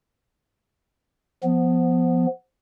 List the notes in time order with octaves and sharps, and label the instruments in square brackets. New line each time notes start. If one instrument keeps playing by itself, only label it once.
[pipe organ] F3 B3